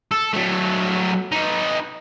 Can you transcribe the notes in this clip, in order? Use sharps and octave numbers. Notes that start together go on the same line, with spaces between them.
A4
F#3 A3
D#4 B4